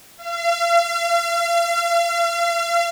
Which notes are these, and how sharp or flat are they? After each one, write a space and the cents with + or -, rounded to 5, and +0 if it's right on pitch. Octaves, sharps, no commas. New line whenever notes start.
F5 -40